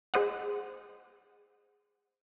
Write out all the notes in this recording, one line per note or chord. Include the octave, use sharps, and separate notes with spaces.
G#4 C5 D#5 F#5